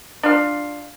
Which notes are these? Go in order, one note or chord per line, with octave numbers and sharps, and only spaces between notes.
D4 F4 F5